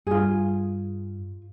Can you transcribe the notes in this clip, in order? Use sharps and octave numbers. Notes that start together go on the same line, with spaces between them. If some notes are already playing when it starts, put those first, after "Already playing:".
G2 F4 G#4